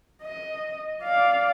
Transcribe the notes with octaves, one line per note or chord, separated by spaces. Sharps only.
D#5
D5 F5